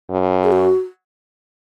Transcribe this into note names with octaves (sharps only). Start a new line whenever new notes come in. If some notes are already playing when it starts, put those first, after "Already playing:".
F#2
G#4
F#4